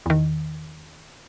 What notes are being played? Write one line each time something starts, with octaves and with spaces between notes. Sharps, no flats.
E2 D#3